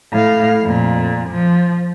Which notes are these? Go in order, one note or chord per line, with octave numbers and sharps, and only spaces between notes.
A2 F5
F2 A#2
F3